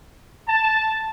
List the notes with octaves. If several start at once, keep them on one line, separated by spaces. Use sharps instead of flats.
A5